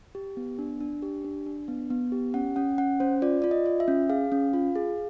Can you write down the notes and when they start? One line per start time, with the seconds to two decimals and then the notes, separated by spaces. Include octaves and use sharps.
0.15 G4
0.37 B3
0.59 D4
0.80 D4
1.02 G4
1.25 D4
1.46 D4
1.68 B3
1.90 B3
2.12 G4
2.34 C#4 F#5
2.56 C#4 F#5
2.78 C#4 F#5
3.00 C#4 C5
3.22 F4 D5
3.42 F4 D5
3.51 D#5
3.66 F4
3.80 E5
3.88 C#4
4.10 G#4 F5
4.32 C#4
4.53 F4
4.75 G#4